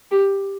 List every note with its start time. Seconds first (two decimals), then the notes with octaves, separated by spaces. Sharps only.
0.11 G4